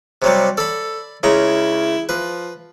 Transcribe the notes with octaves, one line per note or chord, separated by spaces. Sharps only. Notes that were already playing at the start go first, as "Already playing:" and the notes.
C3 F#3 G3
A4 D5 B5
C#2 C#3 E4 A#5
F3 B4